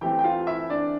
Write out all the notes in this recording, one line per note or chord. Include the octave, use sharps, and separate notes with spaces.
E3 A3 C4 G4 G5
G5
F4 F5
E4 E5
D4 D5